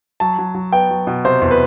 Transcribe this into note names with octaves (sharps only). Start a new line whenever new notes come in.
F#3 A5
F#3
F#3
B3 G5
F#3
B2
C3 C5
E2
B4